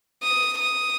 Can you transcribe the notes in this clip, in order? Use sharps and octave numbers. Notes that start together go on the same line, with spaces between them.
D#6
D#6